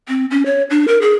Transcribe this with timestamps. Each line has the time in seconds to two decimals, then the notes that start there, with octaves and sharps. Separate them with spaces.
0.08 C4
0.31 C#4
0.46 C#5
0.70 D4
0.88 A#4
1.01 G#4